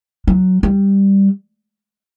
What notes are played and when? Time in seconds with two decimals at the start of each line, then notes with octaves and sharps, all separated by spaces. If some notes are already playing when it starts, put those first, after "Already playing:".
0.27 F#3
0.63 G3